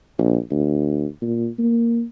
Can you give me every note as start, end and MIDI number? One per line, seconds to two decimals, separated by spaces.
0.18 0.38 34
0.50 1.05 38
1.21 1.47 46
1.59 2.04 58